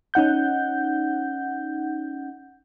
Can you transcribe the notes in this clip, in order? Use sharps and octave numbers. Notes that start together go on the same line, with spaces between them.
C#4 D#4 F#5 G6